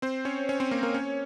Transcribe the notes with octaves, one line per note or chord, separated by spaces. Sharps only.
C4 C5
C#4 C#5
C#4 C#5
C4 C5
A#3 A#4
A#3 A#4
C#4 C#5